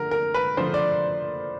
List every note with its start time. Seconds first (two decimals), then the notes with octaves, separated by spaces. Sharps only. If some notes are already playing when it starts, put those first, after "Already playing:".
Already playing: D3 F3 A3 A#4
0.11 A#4
0.34 B4
0.57 D3 F3 A3 C5
0.74 D5